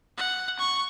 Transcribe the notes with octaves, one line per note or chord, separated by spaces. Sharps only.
F#5
C#6